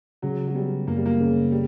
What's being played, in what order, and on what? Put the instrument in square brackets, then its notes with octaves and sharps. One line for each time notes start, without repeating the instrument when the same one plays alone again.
[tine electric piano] C#3 [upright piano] F#3
[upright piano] F#3
[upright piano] G3 [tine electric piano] B3
[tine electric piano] F#2 [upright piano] A#3
[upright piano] G3
A#3
[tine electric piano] C#3
[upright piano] G3